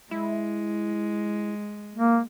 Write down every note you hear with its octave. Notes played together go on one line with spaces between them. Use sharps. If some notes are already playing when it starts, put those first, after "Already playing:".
G#3 E4
A#3